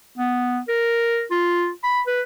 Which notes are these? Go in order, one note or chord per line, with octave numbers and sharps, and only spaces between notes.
B3
A#4
F4
B5
B4